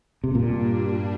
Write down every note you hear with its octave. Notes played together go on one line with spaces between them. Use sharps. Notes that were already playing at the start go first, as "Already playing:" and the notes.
C3
G2 A#2 G3 A#3 D4